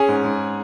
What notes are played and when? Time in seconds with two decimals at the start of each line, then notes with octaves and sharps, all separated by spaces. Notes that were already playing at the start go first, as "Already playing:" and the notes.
Already playing: C#4 G#4
0.09 G#2
0.25 G#2